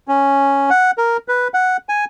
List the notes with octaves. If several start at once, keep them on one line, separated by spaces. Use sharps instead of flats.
C#4
F#5
A#4
B4
F#5
G#5